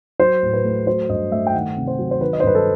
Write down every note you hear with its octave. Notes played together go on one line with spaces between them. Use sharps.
F#3 C5
A2
B4
A3
F#3 C5
G2 D#5
A3 E5
G5
D#3 F#5
C3
C5
F#3
C5
D#3 B4
D#5
C5
G2 B4
A4